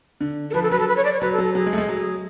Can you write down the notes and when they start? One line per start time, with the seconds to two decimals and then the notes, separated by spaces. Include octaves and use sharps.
0.21 D3
0.50 A4
0.54 F3 B4
0.63 A4
0.71 F#3 B4
0.80 A4
0.88 B4
0.97 C#5
1.05 D5
1.13 C#5
1.21 F#3 B4
1.33 A4
1.38 F#3
1.44 A4
1.55 F#3 G#4
1.66 G#3
1.73 A3
1.78 G#3
1.89 F#3